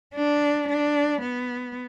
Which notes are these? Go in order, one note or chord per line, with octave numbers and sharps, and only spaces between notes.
D4
D4
B3